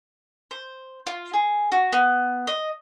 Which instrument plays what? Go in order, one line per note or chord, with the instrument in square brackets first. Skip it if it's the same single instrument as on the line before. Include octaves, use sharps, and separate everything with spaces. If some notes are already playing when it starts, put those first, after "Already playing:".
[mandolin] C5
F4
G#4
F#4
B3
D#5